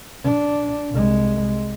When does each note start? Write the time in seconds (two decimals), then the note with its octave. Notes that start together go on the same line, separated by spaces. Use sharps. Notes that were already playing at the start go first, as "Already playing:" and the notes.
0.25 D4
0.91 C2 G#3